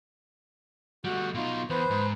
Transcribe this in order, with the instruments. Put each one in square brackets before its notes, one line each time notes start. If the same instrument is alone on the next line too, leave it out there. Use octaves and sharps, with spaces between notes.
[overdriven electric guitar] G3 A3 [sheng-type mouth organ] F#4
[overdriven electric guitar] B2 D#4 [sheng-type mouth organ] F4
[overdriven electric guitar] E2 [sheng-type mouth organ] B4 C5
[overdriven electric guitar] G#2